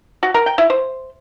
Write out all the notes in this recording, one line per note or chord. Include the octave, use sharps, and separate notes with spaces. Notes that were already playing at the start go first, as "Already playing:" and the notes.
F#4
A#4
G5
E4
C5